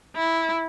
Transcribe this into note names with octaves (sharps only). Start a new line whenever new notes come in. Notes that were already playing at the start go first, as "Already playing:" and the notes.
E4